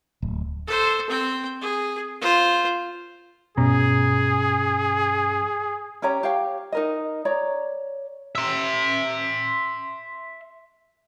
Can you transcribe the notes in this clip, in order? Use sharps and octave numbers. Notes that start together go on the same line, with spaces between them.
D1
A4 C5
C4 G5
G#4
F4 C5
G2 B2 C#4 G#4 A#5
C#4 G4 C#5 A#5
G4 C#5 F5 G5
D#4 A#4 D#5
C#5 D5 A#5
E5 C6